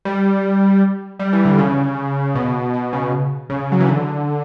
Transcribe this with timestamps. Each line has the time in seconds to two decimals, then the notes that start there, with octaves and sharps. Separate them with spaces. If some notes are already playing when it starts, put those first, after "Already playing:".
0.05 G3
1.19 G3
1.33 E3
1.45 D3
1.58 C#3
2.35 B2
2.74 B2
2.93 C#3
3.50 C#3
3.72 F#3
3.80 E3
3.89 D3